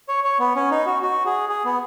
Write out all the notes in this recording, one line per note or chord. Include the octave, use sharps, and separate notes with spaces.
C#5
C#5
B3
C#4
D#4
F#4
F#4
G#4
G#4
B3